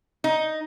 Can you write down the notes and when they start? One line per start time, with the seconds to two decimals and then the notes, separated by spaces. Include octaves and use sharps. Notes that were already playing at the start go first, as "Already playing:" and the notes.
0.24 D#4